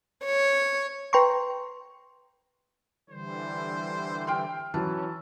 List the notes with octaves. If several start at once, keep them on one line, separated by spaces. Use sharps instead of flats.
C#5
B4 G5 A#5 C6 C#6
D3 E3 G3 C5
G5 C6 F6
E3 F#3 C#4 A5